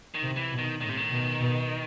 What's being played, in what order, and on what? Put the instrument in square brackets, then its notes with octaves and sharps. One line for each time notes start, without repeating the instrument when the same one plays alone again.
[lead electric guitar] D#3
[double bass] C3
[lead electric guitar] E3
[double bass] B2
[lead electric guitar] D#3
[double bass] A2 [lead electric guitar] D#3
[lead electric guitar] C3
D#3
[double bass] B2
B2